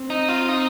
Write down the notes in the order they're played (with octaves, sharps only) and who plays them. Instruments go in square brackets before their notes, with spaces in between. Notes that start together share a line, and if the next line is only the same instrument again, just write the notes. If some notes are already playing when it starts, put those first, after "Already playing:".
Already playing: [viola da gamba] C4
[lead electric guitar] D#4
F4
D#4